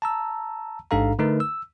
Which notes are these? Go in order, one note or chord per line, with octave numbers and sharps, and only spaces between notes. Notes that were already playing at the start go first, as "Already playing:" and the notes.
A5 A#5 E6
A1 G#2 D4 A4 F5 A#5
D3 A3 D#4 A#4 B4
E6